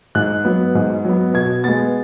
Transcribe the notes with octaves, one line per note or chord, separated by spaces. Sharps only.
G#2 F#6
F#3 B3
G#2
F#3 B3
B2 G#6
G#3 B3 A6